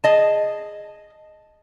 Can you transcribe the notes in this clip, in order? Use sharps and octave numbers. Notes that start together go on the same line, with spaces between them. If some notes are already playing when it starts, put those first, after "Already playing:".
G#4 D#5 A5